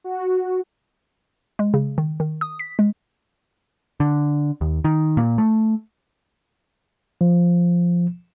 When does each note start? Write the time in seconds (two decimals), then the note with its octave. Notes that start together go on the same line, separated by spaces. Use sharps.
0.04 F#4
1.59 G#3
1.74 C#3
1.98 D#3
2.20 D#3
2.41 D#6
2.59 B6
2.79 G#3
4.00 D3
4.61 D#2
4.84 D#3
5.17 A#2
5.38 A3
7.21 F3